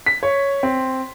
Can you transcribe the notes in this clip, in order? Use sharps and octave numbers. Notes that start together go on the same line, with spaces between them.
B6
C#5
C4